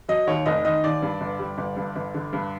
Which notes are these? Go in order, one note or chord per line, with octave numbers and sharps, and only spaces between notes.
F#3 D#5
D#2 C#5
F1 D#5
D#3 D#5
D#2 D5
G2
G1
G3
G1
G2
G1
D3
G2